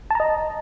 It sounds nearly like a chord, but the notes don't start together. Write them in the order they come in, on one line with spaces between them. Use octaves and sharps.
A5 A#5 D#5